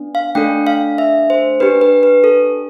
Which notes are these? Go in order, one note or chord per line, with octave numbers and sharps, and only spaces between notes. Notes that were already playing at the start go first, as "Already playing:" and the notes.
Already playing: B3 D4
F5
A3 D4 A4 G5
F5
E5
C5
D4 G4 B4
B4
B4
A4